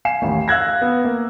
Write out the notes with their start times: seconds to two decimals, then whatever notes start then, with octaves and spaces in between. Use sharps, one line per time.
0.05 F5 G#5 C7 E7
0.22 A1 D#2
0.48 F5 E6 F#6 G#6 A#6
0.82 B3
1.04 A#3